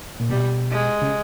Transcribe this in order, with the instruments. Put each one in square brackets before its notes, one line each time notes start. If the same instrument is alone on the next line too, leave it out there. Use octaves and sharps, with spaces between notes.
[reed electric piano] A#2
[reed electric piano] B2 [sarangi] G3
[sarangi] G#3
[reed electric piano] C#3